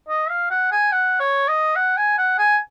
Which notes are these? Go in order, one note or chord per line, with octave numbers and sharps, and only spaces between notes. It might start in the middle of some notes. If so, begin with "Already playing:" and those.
D#5
F5
F#5
G#5
F#5
C#5
D#5
F#5
G#5
F#5
G#5